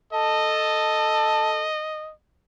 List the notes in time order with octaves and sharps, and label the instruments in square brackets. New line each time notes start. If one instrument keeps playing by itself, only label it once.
[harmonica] A4 A5 [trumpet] D#5